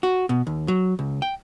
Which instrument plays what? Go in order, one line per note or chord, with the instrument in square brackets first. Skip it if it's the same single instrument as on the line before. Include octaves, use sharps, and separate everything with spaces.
[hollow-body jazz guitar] F#4
B2
D#2
F#3
C#2
G5